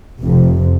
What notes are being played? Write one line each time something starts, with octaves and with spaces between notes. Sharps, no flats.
F1 F2 C3